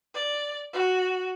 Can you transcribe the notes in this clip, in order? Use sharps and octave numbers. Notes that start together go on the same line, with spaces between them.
D5
F#4